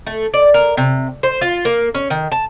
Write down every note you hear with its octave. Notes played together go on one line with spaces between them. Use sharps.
A3
D5
A#4
C3
C5
F4
A#3
C#4
D#3
A5